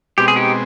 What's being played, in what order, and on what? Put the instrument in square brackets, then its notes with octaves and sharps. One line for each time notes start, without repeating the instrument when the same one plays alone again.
[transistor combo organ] B2 G#3 C4 [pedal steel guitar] G4
[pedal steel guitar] G#4
D#4 G4